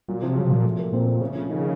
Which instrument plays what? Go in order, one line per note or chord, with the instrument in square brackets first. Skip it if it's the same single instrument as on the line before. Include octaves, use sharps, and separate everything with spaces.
[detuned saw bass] A#2 [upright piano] F#3
[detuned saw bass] C3 [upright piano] F3
[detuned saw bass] C#3 [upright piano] F#3
[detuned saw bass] C3
[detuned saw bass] A#2 [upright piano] F#3
[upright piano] A3
A#3
[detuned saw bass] A#2 [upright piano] C4
[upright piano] A#3
[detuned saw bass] C#3 [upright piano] A3
[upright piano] F3
D#3